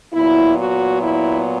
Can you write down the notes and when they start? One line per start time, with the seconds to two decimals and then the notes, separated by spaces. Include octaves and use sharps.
0.13 A#2 F#3 B3 E4
0.58 F#4
1.03 E4